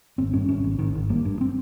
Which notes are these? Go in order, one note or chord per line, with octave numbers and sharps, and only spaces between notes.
G#1 C4
G2 C#4
G#1 C#4
G#1
G#1 D#3
G#1
G2 A#3
G2
C4